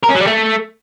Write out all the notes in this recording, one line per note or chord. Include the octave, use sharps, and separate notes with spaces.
A#4
C#4
F#3
G3
A3